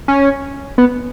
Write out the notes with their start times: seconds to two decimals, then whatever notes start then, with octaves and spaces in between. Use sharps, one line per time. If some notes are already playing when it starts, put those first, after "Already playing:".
0.08 C#4
0.78 B3